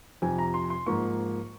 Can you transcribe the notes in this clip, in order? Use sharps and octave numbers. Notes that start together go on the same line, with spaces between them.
F2 C3 F3 G#5
A#5
C6
C6
G#2 F3 A#3 C#6